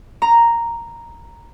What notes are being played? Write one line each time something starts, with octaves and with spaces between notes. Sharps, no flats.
A#5